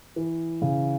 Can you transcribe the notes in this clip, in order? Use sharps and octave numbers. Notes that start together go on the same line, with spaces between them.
E3
C#3